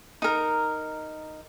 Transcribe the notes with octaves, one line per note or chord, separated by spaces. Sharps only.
D#4 A#4